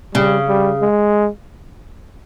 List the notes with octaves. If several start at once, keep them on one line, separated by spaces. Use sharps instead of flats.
C#3 G3
G3
G#3